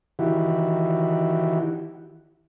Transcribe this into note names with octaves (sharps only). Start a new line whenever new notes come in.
D#3 E3 E4 F#4 G4